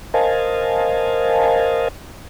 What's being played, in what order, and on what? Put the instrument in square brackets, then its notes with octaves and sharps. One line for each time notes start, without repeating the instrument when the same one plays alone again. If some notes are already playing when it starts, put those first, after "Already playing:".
[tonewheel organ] A#4 C5 D#5 F5 G#5 A5